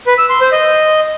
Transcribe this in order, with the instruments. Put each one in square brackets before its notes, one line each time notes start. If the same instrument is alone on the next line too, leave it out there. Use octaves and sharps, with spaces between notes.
[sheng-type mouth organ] B4
E6
C6
C5
D#5